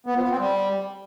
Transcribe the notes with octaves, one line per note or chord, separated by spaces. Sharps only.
B3
F3
B3
C4
G3